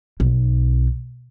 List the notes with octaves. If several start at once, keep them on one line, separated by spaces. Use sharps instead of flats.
B1